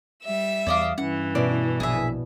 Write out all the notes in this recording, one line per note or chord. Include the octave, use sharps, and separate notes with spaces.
G3 E5 E6
E2 D5 D#5 F5
G2 E3 C#4 F#5
B2 E4 D5
A#1 G#4 E5